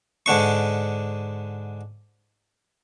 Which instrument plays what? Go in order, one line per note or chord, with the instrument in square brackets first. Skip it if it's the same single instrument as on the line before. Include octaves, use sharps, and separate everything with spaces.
[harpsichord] G#2 D3 D4 C#6